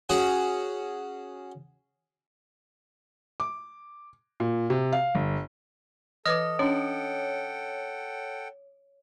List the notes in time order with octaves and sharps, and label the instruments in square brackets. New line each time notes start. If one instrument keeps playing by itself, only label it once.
[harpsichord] C#4 F#4 G#4
[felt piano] D6
A#2
C3
F5
G1
[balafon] E3 B4 D6 [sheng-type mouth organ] A4 [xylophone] D#5 F6 [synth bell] D#6
[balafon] C#4 D4 [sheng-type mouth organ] A4 F#5 G5 [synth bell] C#5